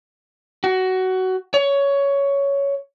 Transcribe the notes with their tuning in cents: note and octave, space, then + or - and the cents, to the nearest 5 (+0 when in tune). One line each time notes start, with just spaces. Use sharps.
F#4 +15
C#5 +10